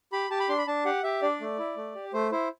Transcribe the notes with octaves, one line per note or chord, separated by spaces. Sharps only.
G4 B5
G4 A5
B5
D4 C6
B5
D4 A5
G4 F#5
G4 E5
D4 D5
A3
E4
A3
G4
A3 C5
E4 C5